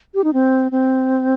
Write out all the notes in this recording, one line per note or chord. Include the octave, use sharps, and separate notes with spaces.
G4
D#4
C4
C4